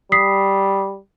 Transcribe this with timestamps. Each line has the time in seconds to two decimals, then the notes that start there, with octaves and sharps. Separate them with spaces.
0.12 G3 D#6 B6 C7